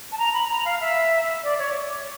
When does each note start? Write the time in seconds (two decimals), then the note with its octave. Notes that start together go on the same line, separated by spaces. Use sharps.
0.12 A5
0.18 A#5
0.34 B5
0.49 A#5
0.65 F5
0.81 E5
1.43 D5
1.59 C#5